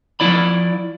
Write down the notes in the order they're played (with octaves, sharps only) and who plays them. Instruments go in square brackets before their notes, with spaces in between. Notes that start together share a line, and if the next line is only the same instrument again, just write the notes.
[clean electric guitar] F3 E4 D5 B5